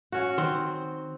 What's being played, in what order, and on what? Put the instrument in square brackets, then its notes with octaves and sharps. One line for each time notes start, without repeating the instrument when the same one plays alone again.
[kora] C#4 F#4
[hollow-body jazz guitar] D#3 C5 [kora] C4